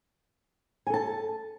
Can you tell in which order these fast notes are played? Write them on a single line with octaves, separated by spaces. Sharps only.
G#5 A4 A5